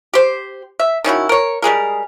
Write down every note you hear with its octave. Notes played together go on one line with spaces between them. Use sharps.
G4 C5
E5
D#3 C#4 E4 F#4
A#4 C#5
G3 G#3 G#4 A#4